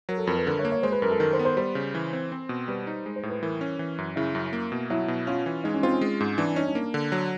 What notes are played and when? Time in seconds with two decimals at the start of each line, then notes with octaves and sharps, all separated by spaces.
0.09 F#3 A#4
0.18 A4
0.27 F2 A#4
0.37 B4
0.46 D3 A#4
0.58 C#5
0.65 A#3
0.71 C#5
0.83 G#3 C5
0.92 B4
1.02 F#2 A#4
1.11 A4
1.20 D#3 A#4
1.33 C5
1.39 B3
1.45 C5
1.57 G3 C5
1.75 C#3
1.95 E3
2.13 C4
2.32 C4
2.49 B2
2.68 G3 B4
2.87 D#4
3.06 G#3
3.16 C5
3.23 A2
3.30 B4
3.42 E3 A#4
3.61 C#4
3.79 E3
3.98 F#2
4.16 C#3 E4
4.35 F#2
4.53 A#3
4.72 B2
4.90 F#3 E4
5.08 B2
5.27 C#4 F4
5.46 E3
5.64 G#3 D#4
5.74 C#4
5.83 C4 F4
5.92 C#4
6.01 G#3
6.20 G#2
6.38 E3 D4
6.56 C#4 D#4
6.66 D4
6.75 A#3
6.94 D3
7.12 F#3